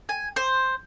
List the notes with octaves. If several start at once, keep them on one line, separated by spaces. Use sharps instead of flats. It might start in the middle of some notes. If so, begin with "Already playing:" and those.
G#5
C5